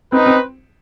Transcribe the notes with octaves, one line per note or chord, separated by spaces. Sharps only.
C4 D#4 B4
C4